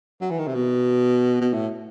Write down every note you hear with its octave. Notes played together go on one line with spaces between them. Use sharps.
F#3
E3
D#3
C3
B2
B2
A2